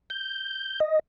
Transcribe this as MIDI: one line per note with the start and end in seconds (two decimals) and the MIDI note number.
0.10 0.80 91
0.80 0.99 75